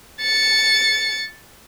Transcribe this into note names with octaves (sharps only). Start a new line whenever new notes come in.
A6 C#7